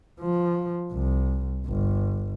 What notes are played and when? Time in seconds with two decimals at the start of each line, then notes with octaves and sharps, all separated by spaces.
0.21 F3
0.92 C2
1.67 G1